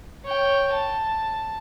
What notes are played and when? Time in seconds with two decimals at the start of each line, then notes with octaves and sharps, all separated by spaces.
0.24 C#5 G5
0.72 A5